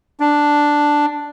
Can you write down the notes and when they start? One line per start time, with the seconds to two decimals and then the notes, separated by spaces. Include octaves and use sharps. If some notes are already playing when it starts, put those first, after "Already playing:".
0.20 D4